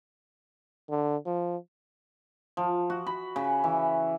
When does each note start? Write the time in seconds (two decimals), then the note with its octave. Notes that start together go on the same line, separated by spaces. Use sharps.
0.90 D3
1.26 F3
2.57 F3
2.90 F#4
3.06 B5
3.36 C#3
3.64 E3